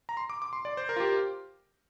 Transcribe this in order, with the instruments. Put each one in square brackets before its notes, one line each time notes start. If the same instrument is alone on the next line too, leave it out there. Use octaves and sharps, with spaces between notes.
[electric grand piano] A#5
C6
D6
D6
C6
D5
C5
A#4
F4
G4